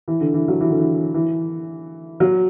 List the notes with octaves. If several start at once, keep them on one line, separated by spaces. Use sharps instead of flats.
E3
D3
E3
F#3
E3
D3
E3
E3
F#3